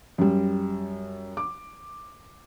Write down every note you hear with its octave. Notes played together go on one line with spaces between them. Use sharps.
F#2 G3
D6